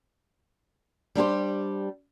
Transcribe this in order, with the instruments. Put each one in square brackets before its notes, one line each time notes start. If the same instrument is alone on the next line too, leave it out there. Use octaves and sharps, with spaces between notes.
[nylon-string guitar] G3 D4 G4 C5